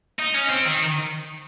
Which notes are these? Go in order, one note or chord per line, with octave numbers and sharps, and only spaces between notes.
D#4
C#4
C4
D#3